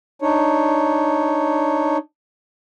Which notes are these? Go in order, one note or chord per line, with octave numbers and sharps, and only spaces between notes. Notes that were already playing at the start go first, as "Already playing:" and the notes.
D4 D#4 C#5